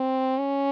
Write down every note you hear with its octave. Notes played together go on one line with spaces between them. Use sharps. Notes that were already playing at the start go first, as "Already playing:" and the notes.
Already playing: C4
C#4